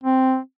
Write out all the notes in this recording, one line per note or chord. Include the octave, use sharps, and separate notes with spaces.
C4